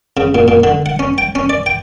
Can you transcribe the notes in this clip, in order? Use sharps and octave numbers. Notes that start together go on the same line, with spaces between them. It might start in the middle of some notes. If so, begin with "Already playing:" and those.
C#3
A#2
A#2
D3
F#5
C#4
G5
C#4
D5
G5